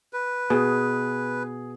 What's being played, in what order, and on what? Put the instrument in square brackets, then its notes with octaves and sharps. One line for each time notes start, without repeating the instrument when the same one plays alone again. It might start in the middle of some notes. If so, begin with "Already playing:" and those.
[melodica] B4
[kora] B2 [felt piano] G#4